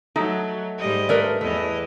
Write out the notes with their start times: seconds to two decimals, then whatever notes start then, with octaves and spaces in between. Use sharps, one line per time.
0.16 F#3 A3 D#4
0.78 G#2 G3 D#5
1.09 A3 A#4 B4 D5
1.41 E2 E3 A3 D#5